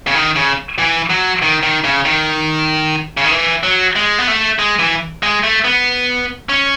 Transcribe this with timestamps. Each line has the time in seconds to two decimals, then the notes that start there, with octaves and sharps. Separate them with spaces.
0.07 C#3
0.15 D#3
0.36 C#3
0.78 E3
1.10 F#3
1.42 D#3
1.63 D#3
1.84 C#3
2.05 D#3
3.17 C#3
3.25 D#3
3.32 E3
3.63 F#3
3.96 G#3
4.19 B3
4.28 A3
4.59 G#3
4.79 E3
5.23 G#3
5.43 A3
5.64 B3
6.49 C#4